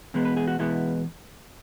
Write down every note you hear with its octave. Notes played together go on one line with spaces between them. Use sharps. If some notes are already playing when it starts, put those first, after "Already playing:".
E2 B2 G#3 B3
B4
G#4
F#4
E2 B2 G#3 B3 E4